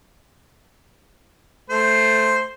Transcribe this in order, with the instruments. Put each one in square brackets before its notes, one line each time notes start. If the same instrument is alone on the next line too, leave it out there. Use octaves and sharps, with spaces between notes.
[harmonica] A3 C5